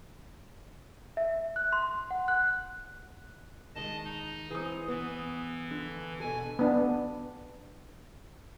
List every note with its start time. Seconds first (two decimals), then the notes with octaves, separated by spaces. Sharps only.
1.17 E5
1.56 F#6
1.73 C6
2.11 F#5
2.28 F#6
3.75 D#3 G#3 D#5 A5
4.05 D#4
4.51 E3 C4 G#4 D#6
4.88 E3 B3
5.71 D3
6.20 B2 A4 G#5
6.59 B3 D4